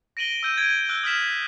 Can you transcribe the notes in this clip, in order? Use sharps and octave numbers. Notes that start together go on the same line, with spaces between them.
A#6 D7 D#7 F#7 G7
E6 G6 D#7
G#6 D7 D#7
E6 F#6 G7
D#6 F6 B6 E7